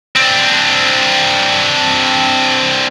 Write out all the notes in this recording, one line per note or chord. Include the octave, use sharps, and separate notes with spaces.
C4 D4